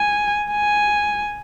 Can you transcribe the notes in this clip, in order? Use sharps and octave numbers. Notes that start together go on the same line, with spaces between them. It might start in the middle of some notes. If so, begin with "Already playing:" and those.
Already playing: G#5
G#5